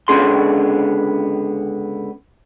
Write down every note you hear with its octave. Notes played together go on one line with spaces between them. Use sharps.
C#2 D3 B3 C#4 G#4 C6